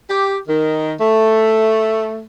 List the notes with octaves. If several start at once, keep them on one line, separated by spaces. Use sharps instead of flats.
G4
D#3
A3